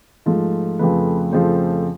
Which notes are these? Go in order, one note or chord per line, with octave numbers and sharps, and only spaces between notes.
G#2 F3 A3
F2 C#3 F3 A3 B4
F2 C#3 F3 A3 C5